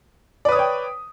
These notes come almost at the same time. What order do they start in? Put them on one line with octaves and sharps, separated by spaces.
D5 B4 D#6 C#5 G5